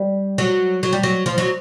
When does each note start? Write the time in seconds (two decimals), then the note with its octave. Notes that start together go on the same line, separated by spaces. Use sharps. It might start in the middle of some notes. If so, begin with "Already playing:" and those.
Already playing: G3
0.38 F#3
0.83 F#3
0.93 G3
1.03 F#3
1.26 F3
1.38 F#3